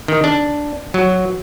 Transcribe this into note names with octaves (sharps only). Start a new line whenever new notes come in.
D#3
D4
F#3